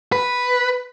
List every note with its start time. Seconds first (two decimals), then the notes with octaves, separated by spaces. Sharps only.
0.12 B4